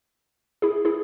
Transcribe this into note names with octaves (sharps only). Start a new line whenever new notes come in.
E4 G#4
E4 G#4